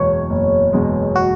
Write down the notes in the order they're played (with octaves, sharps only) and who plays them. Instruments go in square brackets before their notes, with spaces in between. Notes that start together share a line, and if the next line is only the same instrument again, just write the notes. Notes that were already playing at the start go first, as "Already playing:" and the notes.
Already playing: [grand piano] F#1 E2 B2 G#3 [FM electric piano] C#5
[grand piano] F#1
E2 B2 G#3
[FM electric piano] F#4